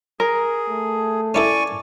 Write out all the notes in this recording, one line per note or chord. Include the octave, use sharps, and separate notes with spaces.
G#4 A#4
A3
C#4 E4 A4 D5 G#5 C#6